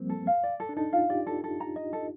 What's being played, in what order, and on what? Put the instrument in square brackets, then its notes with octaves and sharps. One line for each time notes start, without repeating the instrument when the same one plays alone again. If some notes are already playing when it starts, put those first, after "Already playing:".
Already playing: [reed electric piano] F3 G3 A#3 C4
[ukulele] A4
F5
D5
A4
[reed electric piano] D4
[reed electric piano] D#4 [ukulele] A4
[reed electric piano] F4 [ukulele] F5
[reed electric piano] G4 [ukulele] D5
[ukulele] A4
A4
A#5
D#5
A4